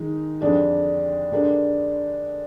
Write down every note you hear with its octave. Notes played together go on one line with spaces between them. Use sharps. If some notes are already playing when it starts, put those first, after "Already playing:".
Already playing: D#3 G#3 D#4
F2 D3 G#3 D4 G4
D3 G#3 D4 G4 A#4